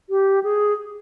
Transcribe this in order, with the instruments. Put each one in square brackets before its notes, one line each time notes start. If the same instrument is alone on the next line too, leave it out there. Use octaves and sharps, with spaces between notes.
[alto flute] G4
G#4